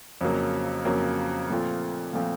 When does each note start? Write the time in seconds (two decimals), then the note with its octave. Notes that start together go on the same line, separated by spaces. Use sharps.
0.21 F2 C#3 F#3 A#3
0.85 F2 C#3 F#3 A#3
1.50 A#2 F3 A3 C4 F4
2.13 A#2 F3 A3 C4 F4